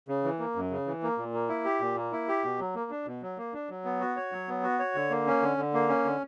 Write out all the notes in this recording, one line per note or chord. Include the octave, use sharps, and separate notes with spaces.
C#3
E3
A#3
F#2
C#3
E3
A#3
A#2
A#3
E4
G4
A#2
A#3
E4
G4
B2
F#3
A#3
D4
B2
F#3
A#3
D4
F#3
B3
F#4
C#5
F#3
B3
F#4
C#5
D3
A#3
C#4
D3
D3
A#3
C#4
D3